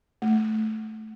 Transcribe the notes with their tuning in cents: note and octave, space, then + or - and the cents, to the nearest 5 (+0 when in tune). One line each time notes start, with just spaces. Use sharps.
A3 -10